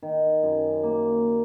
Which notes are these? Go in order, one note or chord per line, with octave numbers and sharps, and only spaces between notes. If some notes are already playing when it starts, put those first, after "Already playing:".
D#3
F#2
A#3